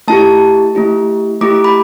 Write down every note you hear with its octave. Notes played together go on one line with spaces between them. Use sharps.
A3 E4 G4 A5
A3 E4 G4
A3 E4 G4 D6
B5